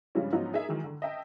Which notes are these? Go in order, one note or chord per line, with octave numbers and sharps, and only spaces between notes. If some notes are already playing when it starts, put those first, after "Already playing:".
G2 C#3 F3 G3 G#3 C#4
G#2 F3 F#3 B3 C#4 D#4
D#4 G#4 A#4 E5
D#3 E3 F#3 G#3
D3
D#5 E5 G5 A5